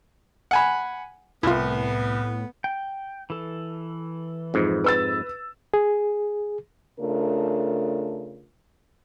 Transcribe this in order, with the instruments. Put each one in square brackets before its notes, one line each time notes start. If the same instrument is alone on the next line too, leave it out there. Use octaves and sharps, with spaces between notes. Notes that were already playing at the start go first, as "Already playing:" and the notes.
[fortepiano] F#5 G#5 B5
[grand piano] C2 [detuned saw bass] A2 [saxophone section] B3 [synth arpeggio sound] E4 F4
[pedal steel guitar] G5
E3 A4
[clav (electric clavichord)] F2 G#2
[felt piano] B4 E6 A6
[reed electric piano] G#4
[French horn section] C#3 A3 D4 F4 A#4